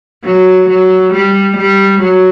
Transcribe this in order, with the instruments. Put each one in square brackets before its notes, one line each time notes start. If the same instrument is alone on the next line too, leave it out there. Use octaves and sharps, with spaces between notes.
[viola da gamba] F#3
F#3
G3
G3
F#3